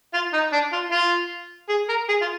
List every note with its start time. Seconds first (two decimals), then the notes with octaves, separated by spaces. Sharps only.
0.14 F4
0.33 D#4
0.52 D4
0.72 F4
0.91 F4
1.69 G#4
1.89 A#4
2.09 G#4
2.21 F4